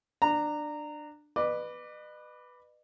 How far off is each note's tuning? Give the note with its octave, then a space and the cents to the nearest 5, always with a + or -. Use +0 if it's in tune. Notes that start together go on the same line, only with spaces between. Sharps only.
D4 +15 A#5 -15
B4 +0 D#5 -45 D6 +0